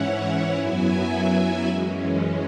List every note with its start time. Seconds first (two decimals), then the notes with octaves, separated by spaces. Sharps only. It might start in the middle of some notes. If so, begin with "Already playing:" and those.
Already playing: G#2 E3 C#4 E4 C#5 F#5
0.55 F#2 F#3 B3 E4 E5 G#5
1.10 E5 G#5
1.66 F#2 E3 G#3 C#4